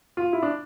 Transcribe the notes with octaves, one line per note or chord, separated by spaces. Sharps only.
F4
E4
D4